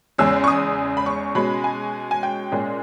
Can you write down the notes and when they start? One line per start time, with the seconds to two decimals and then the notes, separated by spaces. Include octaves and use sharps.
0.18 E2 C#3 G#3 C#4 E6
0.44 C#6
0.48 D#6
0.97 B5
1.06 C#6
1.35 B2 G#3 C#4 B5
1.64 G#5
2.11 G#5
2.23 G5
2.52 A#2 G#3 C#4